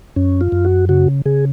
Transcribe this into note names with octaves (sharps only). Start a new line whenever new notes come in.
F#2 C#4
F4
F#2
F#4
C#3 F#4
C#3 G#4